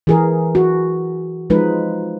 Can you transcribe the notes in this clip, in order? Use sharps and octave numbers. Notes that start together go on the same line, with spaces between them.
E3 G#4 A#4
F#4
F3 G#3 D#4 B4